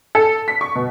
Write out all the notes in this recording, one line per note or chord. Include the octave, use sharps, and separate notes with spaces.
A4
B6
C#6
B2